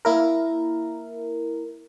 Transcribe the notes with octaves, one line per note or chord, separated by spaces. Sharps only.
A#3 E4 A#4